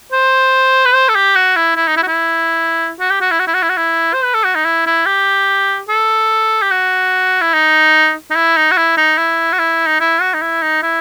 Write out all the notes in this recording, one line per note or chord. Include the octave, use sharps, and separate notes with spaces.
C5
B4
C5
A4
G4
F#4
E4
E4
D#4
E4
F#4
E4
F#4
G4
F#4
E4
F#4
E4
F#4
E4
F#4
E4
C5
B4
A4
F#4
D#4
E4
E4
G4
A4
G4
F#4
E4
D#4
D#4
E4
D#4
F#4
E4
D#4
E4
F#4
E4
D#4
E4
F#4
D#4
E4
D#4
E4